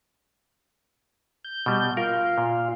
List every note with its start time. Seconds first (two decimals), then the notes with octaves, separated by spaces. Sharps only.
1.45 G6
1.66 B2 G3
1.97 F4 A#4 F5
2.38 A#2